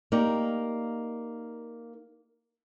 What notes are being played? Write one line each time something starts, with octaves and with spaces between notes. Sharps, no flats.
A#3 D#4 G4 D5